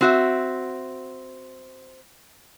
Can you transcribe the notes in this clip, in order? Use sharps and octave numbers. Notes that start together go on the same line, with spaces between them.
C4 F#4 E5